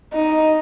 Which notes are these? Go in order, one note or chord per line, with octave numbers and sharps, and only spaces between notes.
D#4